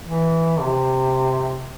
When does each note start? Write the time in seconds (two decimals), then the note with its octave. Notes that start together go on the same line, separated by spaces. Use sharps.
0.07 E3
0.60 C3